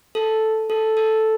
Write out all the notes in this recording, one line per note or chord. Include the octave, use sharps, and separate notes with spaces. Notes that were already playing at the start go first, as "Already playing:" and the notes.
A4
A4
A4